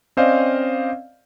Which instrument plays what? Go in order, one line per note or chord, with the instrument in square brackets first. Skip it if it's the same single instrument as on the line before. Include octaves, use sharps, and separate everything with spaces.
[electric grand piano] C4 C#4 C5 D5 D#5 F5